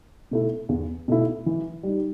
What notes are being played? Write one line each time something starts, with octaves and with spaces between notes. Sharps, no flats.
B2 A3 E4
E2
B2 A3 E4
E3
G3 D#4